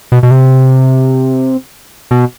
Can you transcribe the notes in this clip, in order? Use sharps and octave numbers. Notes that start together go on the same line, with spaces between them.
B2
B2
C3
B2